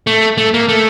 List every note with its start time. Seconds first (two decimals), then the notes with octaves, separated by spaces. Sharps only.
0.07 A3
0.38 A3
0.54 A#3
0.69 A3